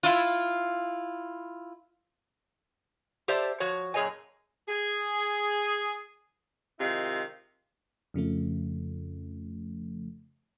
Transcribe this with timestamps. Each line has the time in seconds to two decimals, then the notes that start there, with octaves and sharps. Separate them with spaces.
0.03 E4 F4
3.28 G4 A4 C5 D5 E5 A5
3.60 F3 F#4 C#5
3.94 F#2 A#2 G#4 C#5 D#5 G#5
4.68 G#4
6.79 C3 D#3 G#3 E4 F4
8.14 F2 C#3 F3 A3